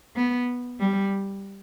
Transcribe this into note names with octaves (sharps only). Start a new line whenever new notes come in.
B3
G3